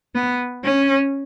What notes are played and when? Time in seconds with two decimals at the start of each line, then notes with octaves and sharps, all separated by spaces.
0.14 B3
0.64 C#4